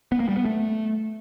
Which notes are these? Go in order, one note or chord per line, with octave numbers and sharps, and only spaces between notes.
B3
A#3
G3
B3
A3